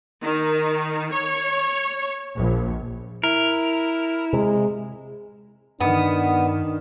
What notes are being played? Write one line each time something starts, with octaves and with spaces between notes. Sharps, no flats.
D#3
C#5
A#1
E4 A#4
C3 G#3
G2 D#3 B3 D4